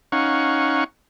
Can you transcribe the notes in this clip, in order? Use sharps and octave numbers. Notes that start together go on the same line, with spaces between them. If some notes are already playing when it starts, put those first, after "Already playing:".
C#4 D#4 F5 F#5 C#6